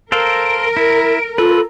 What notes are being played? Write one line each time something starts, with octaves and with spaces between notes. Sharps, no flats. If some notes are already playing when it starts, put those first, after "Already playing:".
A4 A#4 C5 F5 D7
E4
F4 A4 B4